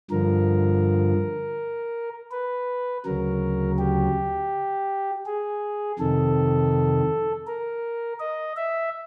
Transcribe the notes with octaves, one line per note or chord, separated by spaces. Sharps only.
G2 D3 F3 A#4
B4
D2 C#3 F#3 A#4
G4
G#4
F2 C3 D#3 A4
A#4
D#5
E5